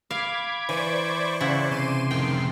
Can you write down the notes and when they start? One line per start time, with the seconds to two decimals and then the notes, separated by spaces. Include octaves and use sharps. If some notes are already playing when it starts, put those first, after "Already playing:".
0.11 F5 B5 D6 G#6
0.69 E3 C5 D5 C#6
1.40 C#3 E4 F#5
1.71 C3 C6 D6 D#7 E7
2.11 F2 A2 D#3 G5